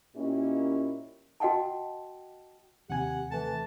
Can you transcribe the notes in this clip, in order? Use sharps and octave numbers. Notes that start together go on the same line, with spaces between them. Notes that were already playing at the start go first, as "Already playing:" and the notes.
A#2 A#3 C#4 E4 G4 D#5
F#4 D#5 F#5 G5 A5
D#2 C3 G4 F#5 G#5
E3 A3 A5